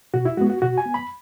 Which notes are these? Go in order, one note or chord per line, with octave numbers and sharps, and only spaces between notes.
B2 F#4
E4
G#3 B3 F#4
F#4
B2 F#4
G#5
B3
B5